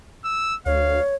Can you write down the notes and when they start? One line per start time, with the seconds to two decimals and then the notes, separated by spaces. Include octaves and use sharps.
0.24 E6
0.66 D2 C#5 F5